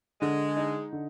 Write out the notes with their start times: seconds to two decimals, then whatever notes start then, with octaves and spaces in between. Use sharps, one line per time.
0.21 D3 G#3
0.57 D#4
0.93 D3